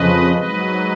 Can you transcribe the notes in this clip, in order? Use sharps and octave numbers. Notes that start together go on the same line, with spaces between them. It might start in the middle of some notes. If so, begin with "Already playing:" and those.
Already playing: F2 C#3 F3 B4 D#5
G#2 F#3 B4 D#5